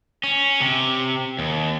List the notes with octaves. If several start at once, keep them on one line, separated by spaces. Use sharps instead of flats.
C#4
C3
D#2